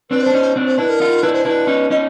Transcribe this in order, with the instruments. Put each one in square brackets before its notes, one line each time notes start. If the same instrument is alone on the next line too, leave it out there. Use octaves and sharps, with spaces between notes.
[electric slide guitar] C4 D4 [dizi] B4
[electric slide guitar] D4 [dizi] C5
[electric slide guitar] C#4 D#4
C4 D4
[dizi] C5
[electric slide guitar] D4 E4 [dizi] B4
[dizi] A#4
[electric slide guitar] D#4 F4
[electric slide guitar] D4 E4 [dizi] B4
[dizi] C5
[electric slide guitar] D4 E4 [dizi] B4
[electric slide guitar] C#4 D#4
[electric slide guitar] C#4 D#4 [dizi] D#5